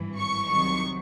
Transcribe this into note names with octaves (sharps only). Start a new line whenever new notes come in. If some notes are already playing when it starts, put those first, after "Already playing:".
Already playing: G#1 G2 E3
C#6
C2 C3 D#3 F#3 C#6